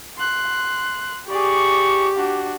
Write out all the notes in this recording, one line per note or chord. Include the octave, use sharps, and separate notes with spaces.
C6 F#6
G4 G#4 D5 C#6
D4 F#4